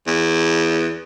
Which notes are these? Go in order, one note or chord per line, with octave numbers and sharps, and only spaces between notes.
E2